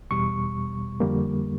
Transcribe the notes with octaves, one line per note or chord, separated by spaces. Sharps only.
E2 B2 G3 C#6
F2 D3 G3 A#3